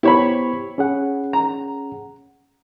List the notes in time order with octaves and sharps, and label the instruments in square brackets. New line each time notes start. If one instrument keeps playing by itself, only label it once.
[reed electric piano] B3 G4 C5 [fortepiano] E4 C#5 B5
[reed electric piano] C#4 G#4 F#5
[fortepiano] A#5